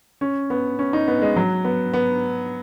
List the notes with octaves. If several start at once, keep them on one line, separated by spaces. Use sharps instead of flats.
C#4
B3
C#4
D#4
B3
G#3
F#3
B3
B3